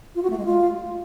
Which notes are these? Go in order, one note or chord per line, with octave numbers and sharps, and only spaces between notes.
F4
F#4
A3
G#3
F4